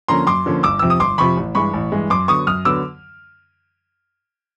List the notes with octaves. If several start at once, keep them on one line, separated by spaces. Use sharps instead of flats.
D3 F3 A#3 C#4 A#5 C6
F#2 C6 D6
D3 F3 A#3 C#4
G1 D6 E6
F2 C3 F3 E6
D#6
G1 C6 D6
F2 C3 F3 B5 C#6
A1
G2 E3 G#3 B5 C#6
A1
G2 E3 G#3
F#2 C6 D6
D3 F#3 B3 C#6 D#6
F#2 D#6 F6
D3 F#3 B3 D6 E6